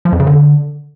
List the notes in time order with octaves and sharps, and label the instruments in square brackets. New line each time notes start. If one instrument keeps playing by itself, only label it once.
[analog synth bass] F3
F2
C#3
D3